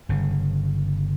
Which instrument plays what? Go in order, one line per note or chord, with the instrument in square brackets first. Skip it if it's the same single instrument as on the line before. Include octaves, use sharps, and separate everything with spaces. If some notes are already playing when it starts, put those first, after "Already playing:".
[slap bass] G1 C#3